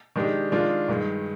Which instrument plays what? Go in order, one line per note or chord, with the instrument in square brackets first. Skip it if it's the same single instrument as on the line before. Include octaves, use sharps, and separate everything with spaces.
[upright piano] D#3 G#3 D4 G4
D#3 G#3 D4 F4
G2 D#3 G#3